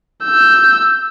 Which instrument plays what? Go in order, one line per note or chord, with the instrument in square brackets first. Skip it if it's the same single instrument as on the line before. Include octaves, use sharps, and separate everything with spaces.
[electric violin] E6 G6